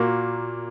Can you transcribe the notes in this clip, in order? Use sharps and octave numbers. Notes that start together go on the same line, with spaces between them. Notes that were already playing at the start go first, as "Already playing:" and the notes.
Already playing: A#2 A#3 F#4